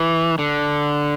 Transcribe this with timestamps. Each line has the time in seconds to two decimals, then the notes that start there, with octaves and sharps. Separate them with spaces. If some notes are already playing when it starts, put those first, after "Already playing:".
Already playing: E3
0.39 D3